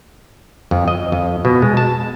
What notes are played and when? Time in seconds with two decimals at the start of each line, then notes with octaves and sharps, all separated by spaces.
0.71 F2
0.88 D#5
1.12 F2
1.45 B2
1.62 G#3
1.77 A5